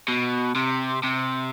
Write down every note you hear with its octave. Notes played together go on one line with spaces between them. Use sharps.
B2
C3
C3